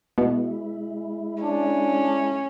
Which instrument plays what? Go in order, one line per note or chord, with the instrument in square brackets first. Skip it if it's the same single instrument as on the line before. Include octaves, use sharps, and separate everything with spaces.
[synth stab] B2 [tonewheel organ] G#3 E4
[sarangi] C#4 [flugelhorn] D4